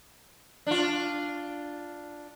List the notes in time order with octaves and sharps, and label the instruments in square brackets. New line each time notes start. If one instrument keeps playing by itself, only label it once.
[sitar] D4 F4